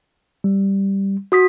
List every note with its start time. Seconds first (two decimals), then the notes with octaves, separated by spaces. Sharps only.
0.44 G3
1.32 F#4 D#6 B6